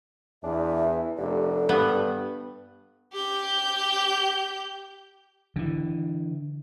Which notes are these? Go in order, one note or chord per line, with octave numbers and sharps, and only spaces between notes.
E2 D4 E5
E3
F1 D3 G4
G2 B3
G4 G6
D3 E3